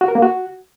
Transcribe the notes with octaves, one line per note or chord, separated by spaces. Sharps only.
F#4
A#4
A#3
F#4